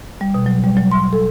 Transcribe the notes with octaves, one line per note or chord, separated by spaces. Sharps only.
G3
B2
F#3
G3
F#3
C6
A4